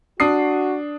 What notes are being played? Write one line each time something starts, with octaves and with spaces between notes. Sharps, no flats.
D4 F#4 D#6 C7